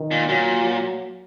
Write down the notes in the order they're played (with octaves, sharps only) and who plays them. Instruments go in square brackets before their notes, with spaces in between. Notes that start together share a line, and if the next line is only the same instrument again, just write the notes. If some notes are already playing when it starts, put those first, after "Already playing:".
Already playing: [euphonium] D#3
[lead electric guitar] A#2
[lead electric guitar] A#2 [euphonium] F#3
[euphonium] F#3